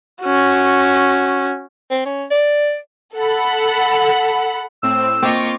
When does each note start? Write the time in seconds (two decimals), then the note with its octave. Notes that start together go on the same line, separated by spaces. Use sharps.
0.22 C#4 F#4
1.91 C4
2.05 C#4
2.31 D5
3.16 A4 F#5 B5
4.83 A2 C4 E6
5.22 A#3 C4 F4 D#5 C#6 D6